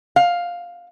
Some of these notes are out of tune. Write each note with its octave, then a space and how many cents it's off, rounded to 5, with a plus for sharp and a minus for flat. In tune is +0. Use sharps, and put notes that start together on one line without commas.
F5 +5